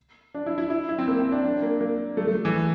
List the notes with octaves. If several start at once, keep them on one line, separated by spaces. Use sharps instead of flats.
D4
E4
E4
E4
E4
C4
A#3
C4
D4
D4
A#3
A#3
A3
A3
E3